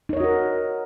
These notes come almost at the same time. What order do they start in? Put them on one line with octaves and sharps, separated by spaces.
D#4 C#5 D#5 F#4 A#4